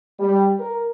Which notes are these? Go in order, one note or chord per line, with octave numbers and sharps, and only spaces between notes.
G3
A#4